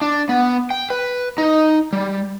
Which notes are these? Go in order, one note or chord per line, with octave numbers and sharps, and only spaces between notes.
D4
B3
G5
B4
D#4
G3